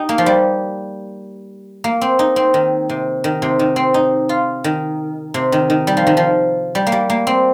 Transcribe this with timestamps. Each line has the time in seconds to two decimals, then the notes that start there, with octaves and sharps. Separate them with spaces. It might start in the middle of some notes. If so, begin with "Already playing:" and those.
Already playing: D#4 G4
0.09 A#3
0.18 F3
0.26 G3
1.84 A#3
2.01 C4
2.19 D#4
2.36 C4
2.54 D#3
2.89 C3
3.24 D#3
3.42 C3
3.59 D#3
3.76 C4
3.94 D#4
4.29 F4
4.64 D#3
5.34 C3
5.52 D#3
5.70 D#3
5.87 G3
5.97 F3
6.07 D#3
6.17 F3
6.75 G3
6.87 A#3
6.92 G3
7.10 A#3
7.27 C4